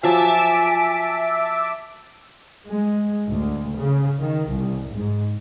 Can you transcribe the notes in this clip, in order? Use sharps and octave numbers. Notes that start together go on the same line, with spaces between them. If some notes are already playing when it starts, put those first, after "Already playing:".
F3 F#3 E5 G#5 A5 D6
G#3
D2
C#3
D#3
C2
G#2